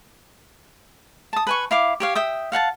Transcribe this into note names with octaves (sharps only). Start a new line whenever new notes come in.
A5 D#6
B4 G#5 C#6
E4 F5 D6
G4 C#5 F5
E5 G5 D#6
F5 F#5 G#5 A5